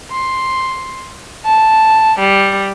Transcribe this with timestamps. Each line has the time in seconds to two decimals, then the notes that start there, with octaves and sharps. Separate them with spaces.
0.10 C6
1.45 A5
2.18 G3